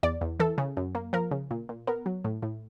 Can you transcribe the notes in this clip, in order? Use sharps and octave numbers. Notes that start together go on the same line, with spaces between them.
E2 D5
E2
E3 A4
C#3
F#2
A#3
F3 A#4
C#3
A#2
A#2
B3 A#4
F#3
A2
A2